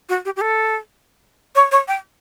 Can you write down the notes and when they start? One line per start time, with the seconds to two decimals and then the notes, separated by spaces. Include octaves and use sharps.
0.09 F#4
0.25 G4
0.36 G4
0.41 A4
1.55 C#5
1.71 C#5
1.88 G5